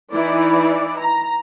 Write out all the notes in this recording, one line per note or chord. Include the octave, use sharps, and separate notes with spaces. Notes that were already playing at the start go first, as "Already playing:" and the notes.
E3 D#4 E4 D5
A#5